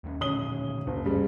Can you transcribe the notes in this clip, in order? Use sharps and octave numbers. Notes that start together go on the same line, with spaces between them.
D#2 G#3 C#4
A#2 D3 D#3 C#4 D#6 G7
F#1 C#2
G2 C#3 G3 G#3